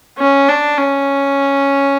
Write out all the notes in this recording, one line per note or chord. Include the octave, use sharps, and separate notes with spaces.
C#4
D4
C#4